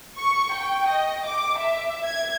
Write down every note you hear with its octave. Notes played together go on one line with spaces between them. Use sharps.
C#6
G5
D#5
D6
E5
G#6